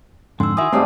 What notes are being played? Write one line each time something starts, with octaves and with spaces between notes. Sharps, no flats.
F2 G#2 D3 C6 E6
D#3 E4 F#4 E5 G#5 D#6
G#2 G3 A3 C4 F5 A5